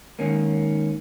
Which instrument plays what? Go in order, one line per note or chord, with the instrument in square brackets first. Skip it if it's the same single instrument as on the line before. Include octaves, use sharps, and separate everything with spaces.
[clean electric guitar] G#2 D#3 A#3 C#4